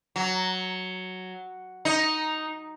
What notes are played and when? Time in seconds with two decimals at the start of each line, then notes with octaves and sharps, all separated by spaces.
0.16 F#3
1.85 D#4